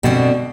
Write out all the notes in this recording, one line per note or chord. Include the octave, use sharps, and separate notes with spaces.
B2 D3 G3 C4